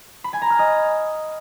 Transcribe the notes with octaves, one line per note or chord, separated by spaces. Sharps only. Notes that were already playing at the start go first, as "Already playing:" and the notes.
B5
G#5
A#5
F6
D#5